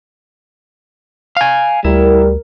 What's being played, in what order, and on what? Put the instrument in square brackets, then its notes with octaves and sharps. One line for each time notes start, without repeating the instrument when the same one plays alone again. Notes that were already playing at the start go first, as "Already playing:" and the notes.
[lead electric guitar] F5 G#5
[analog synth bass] D2 [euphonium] G3 [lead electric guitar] E4 [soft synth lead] A#4